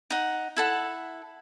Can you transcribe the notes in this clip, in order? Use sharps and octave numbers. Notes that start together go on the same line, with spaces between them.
D#4 F#5
E4 A4 F#5